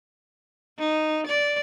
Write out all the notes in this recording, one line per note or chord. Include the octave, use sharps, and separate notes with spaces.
D#4
D5